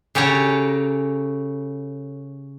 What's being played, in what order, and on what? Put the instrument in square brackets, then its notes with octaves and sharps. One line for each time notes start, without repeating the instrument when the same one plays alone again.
[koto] C#3 G4 A4 C#5 A#5